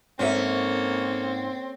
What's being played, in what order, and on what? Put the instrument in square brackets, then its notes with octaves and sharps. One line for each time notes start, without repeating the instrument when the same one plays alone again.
[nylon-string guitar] G#2 E5 [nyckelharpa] A#3 A4 [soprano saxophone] C4 [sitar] C#4